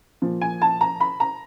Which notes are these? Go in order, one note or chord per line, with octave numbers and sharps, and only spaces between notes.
A#2 F3
G#5
A5
A#5
B5
A#5